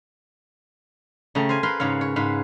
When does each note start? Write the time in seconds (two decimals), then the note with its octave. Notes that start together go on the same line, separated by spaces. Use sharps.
1.35 C#3 A3 G5 A#5
1.49 C5 F5 G#5
1.63 A#4 B4 F5 C6
1.80 G#2 C#3 C#5 F5
2.01 C#5
2.16 G#2 B4 F5